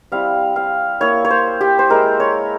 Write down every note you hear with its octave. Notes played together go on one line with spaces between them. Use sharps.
G3 C4 E4 F5
F5
A#3 E4 C#5
C#5
C5
G4
C5
G#3 E4 A#4
C#5